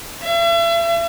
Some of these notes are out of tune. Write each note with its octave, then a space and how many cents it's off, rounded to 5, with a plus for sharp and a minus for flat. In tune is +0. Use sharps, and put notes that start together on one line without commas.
E5 +40